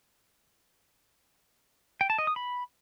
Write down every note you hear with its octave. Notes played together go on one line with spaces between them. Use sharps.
G5
A5
D#5
D#6
B5